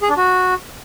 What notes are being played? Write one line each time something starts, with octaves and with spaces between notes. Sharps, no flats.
G#4
D4
F#4